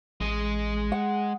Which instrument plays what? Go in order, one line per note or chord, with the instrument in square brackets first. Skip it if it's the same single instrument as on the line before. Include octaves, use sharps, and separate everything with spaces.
[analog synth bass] A1 [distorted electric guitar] G#3 D#5
[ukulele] F#5